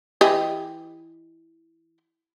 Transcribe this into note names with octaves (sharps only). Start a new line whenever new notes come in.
E3 G4 D#5